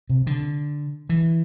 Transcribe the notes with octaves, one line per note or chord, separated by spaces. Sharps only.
C3
D3
E3